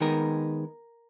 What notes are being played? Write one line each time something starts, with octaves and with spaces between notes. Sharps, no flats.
D#3 G#3 B3 D#4 A#4